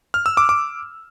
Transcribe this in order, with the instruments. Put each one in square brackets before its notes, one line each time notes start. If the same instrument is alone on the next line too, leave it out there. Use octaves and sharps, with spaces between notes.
[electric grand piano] F6
E6
D6
D6